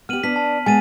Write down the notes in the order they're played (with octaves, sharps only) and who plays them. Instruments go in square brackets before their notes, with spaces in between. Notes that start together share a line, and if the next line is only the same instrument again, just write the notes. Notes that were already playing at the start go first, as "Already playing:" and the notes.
[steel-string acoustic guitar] B3 G4 [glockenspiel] F6 D#7 F#7
[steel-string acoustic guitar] B3 D4 [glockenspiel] B6
[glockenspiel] A5
[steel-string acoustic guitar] G#3 B3 [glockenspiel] G#5 A6 D#7